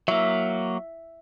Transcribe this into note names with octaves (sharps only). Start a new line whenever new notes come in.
F#3 A#3 E5